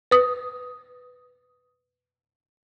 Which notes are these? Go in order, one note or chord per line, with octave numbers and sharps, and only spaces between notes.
B4 D#6